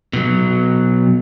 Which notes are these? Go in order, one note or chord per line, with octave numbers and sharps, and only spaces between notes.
B2 F#3